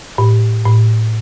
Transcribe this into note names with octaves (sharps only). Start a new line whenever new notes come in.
A2
A2